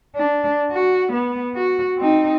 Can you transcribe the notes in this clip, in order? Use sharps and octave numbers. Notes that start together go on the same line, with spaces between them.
D4
F#4
B3
F#4
C4 D#4